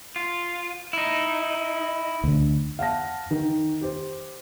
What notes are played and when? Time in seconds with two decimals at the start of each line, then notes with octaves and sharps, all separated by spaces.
0.16 F4
0.93 D#4 E4
2.24 D2 D3
2.79 F5 F#5 A5 A#6
3.31 D#3
3.81 G4 C5